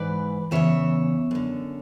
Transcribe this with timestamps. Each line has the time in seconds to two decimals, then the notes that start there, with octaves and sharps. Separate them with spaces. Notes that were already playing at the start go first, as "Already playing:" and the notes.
Already playing: G#2 E3 B4 D5
0.51 E2 C#3 E3 C#5 E5
1.31 F#2 D3